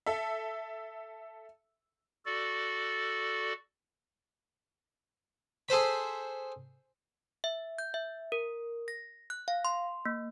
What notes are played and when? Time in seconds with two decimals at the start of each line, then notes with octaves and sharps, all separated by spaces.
0.06 A4 E5
2.26 F#4 A4 D5
5.69 G#4 A4 C5 B5
7.44 E5
7.78 G6
7.94 E5
8.32 A#4
8.88 A#6
9.30 F#6
9.48 F5
9.65 C6
10.05 A#3